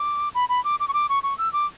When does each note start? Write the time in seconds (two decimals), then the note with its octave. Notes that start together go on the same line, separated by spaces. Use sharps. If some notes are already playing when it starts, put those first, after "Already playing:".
Already playing: D6
0.35 B5
0.49 B5
0.64 D6
0.80 D6
0.88 C#6
0.93 D6
1.09 C#6
1.23 C#6
1.38 E6
1.53 D6